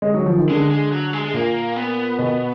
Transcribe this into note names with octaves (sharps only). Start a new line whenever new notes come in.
G#3
F#3
F3
D#3
D3 G#3
G#3
F#3
G#3
G#3
A#2 A#3
B3
B2